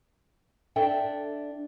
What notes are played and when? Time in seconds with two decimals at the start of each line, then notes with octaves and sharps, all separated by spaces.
0.76 D4 A4 E5 G5